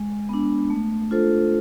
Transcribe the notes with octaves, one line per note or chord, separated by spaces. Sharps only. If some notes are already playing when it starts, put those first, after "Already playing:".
Already playing: G#3
B3 D4
A3
D4 F4 A4 C5